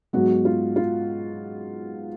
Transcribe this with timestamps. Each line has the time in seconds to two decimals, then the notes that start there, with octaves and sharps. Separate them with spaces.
0.13 G#2 F#3 B3 F#4
0.45 F4
0.76 F4